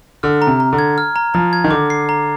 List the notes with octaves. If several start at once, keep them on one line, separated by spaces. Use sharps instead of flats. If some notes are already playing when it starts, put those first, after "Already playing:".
D3 F6
A#5
C3
A#5
D3
G#6
F6
A#5
F3 A#5
G#6
D#3
D3 D6
C7
A#5